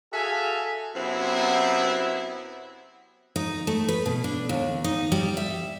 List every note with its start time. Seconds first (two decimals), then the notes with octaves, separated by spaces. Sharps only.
0.13 F#4 G#4 A4 E5 F5 G#5
0.95 F#2 C3 B3 C4 E4
3.36 D#4
3.67 A3
3.88 B4
4.06 B2
4.24 D4
4.49 D#2
4.84 D#4
5.12 G3
5.37 E5